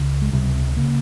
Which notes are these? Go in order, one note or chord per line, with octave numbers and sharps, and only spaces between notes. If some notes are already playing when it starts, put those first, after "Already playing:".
Already playing: C#2 C#3
G#3
C#2 C3 G3
C#3 A#3